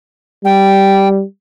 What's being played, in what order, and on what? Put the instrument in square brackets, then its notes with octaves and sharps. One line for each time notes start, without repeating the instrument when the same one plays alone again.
[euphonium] G3 [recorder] G5